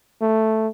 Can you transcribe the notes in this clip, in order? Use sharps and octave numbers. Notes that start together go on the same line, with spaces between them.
A3